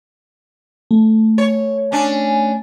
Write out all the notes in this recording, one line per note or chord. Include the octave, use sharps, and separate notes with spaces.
A3
C#5
C#4 D4